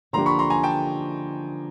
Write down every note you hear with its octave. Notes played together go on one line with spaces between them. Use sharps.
D3 F3 A#3 D4 G4 A#5 C6
B5 C#6
A#5 C6
G#5 A#5
G5 A5